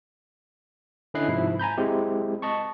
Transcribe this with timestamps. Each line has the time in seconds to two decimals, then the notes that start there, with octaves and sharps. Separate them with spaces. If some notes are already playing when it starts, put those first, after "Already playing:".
1.14 D3 C#4 E4 D#5 F#6 C7
1.28 G#2 C3 F3 E4
1.60 G#5 A#5 B5 G6
1.78 G#3 C4 E4 G4
2.42 D#5 A5 C#6